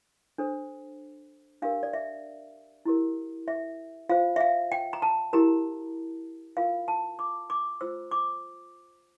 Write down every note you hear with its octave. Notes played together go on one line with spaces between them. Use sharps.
D4 A4 C5
D4 G4 A#4 F5
D5
E5
E4 G4 A#4
E5
F4 C5 F5
E5
F5
G5
A#5
A5
E4 G4 A#4 A#5
F4 A#4 F5
A5
D6
D6
F4 C5 E6
D6